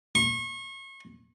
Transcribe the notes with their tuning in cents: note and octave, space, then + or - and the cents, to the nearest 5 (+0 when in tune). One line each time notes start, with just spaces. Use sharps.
C#6 -35